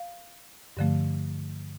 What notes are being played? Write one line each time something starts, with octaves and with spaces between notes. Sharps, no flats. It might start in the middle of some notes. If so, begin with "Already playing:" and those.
Already playing: F5
G2 D3 F3 A3